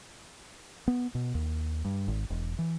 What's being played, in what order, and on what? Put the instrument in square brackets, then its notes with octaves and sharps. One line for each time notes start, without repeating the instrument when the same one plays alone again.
[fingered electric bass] B3
B2
D#2
G2
G#1
E1
E3